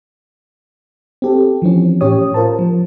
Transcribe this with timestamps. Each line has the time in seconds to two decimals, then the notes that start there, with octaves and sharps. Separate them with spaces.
1.22 C4 G4 A4
1.62 E3 F3 C4 C#4
2.01 A2 C#4 G4 C#5 D#6
2.34 F4 A#4 C5 A5
2.59 F3